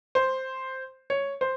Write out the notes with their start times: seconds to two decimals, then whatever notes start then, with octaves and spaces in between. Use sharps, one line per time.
0.15 C5
1.10 C#5
1.41 C5